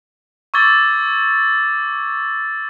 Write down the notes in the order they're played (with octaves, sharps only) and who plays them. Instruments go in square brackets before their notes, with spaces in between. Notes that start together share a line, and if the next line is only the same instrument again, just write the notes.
[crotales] C#6 D6 E6 G#6 A6 G7